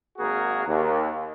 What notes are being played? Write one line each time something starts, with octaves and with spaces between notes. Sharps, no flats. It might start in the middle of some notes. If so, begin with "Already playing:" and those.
G#1 A#3 F#4 G#4 A#4
D#2